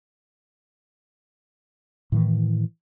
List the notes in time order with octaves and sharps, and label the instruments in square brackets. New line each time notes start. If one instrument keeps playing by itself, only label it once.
[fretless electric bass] A2 D#3 E3